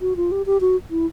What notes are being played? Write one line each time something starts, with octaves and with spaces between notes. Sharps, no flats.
F#4
F4
G4
G4
F#4
E4